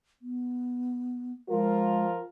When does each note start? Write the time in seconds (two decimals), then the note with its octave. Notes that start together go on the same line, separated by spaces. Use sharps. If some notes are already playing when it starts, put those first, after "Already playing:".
0.22 B3
1.49 F3 G#3 F4 A#4